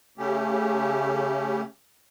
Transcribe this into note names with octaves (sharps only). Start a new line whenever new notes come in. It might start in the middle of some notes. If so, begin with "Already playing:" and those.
C#3 A3 C#4 G4